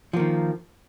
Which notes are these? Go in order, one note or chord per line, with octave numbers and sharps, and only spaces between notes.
D#3 F3 A#3